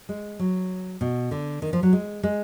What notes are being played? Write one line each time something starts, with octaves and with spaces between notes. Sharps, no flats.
G#3
F#3
B2
D3
D#3
F3
F#3
G#3
G#3